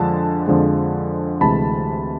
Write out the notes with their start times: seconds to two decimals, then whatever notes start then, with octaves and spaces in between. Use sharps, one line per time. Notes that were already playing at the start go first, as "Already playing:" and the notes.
Already playing: F2 D3 F3 G#3 A5
0.47 F2 D3 F3 G#3
1.41 D2 C3 E3 G#3 A5 B5